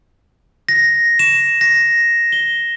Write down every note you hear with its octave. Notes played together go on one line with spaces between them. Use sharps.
A#6
E7
A#6
G7